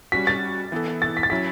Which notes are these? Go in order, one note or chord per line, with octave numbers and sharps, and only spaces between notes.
G3 C#4 F#4 B6
A6
E3 B3 E4 A4
A6
B6
A6
F#3 C#4 E4 B6